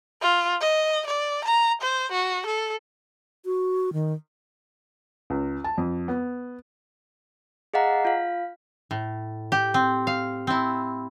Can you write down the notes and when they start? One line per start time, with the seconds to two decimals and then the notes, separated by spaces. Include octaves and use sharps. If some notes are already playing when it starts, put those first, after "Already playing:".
0.22 F4
0.61 D#5
1.07 D5
1.44 A#5
1.81 C5
2.12 F#4
2.46 A4
3.45 F#4
3.93 D#3
5.30 C#2
5.64 A5
5.78 F2
6.08 B3
7.74 G#4 D#5 F5 F#5 A#5
8.05 F4 F5
8.91 A2
9.52 G4
9.74 C4
10.07 F5
10.47 C4 E4